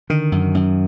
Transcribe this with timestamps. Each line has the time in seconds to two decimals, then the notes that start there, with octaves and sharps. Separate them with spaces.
0.10 D3 D#3
0.32 F#2
0.54 F#2